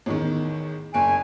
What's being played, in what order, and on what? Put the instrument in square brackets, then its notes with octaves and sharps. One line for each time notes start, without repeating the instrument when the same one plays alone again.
[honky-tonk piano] A1 E2 D#3
[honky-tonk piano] F#1 D7 [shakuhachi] G#5